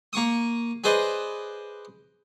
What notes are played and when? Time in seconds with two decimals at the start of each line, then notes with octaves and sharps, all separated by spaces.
0.13 A#3 C#6 D#6
0.84 G#4 B4 C5 D5 D#5